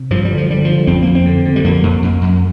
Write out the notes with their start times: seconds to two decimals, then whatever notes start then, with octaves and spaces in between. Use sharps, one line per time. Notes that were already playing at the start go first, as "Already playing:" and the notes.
Already playing: C3
0.10 G2 F3
0.25 G3
0.31 D3
0.38 F3
0.49 D3 G3
0.65 D3 F3
0.87 F2 C4
1.02 F2 A#3
1.15 C4
1.26 D3
1.45 D3
1.56 G3
1.64 F2 A#3
1.83 F2
2.03 F2
2.22 F2